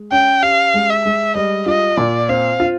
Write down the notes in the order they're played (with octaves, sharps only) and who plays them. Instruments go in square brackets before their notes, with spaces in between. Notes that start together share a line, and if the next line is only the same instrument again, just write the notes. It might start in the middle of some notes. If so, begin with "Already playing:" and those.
Already playing: [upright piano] G#3
[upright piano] C#4 [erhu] G5
[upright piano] G4 [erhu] F5
[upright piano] G#3
[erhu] E5
[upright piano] G#3
[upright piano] G3 [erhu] D#5
[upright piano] F4 [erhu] D#5
[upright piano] A#2 [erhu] D5
[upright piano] C4 [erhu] F5
[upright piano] F4